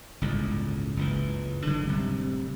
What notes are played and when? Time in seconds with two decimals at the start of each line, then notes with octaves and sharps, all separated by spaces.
0.21 G1 C#2 A2
0.97 F#1 C#2 E3
1.67 D3 F#3 G#3
1.89 D1 C3 G3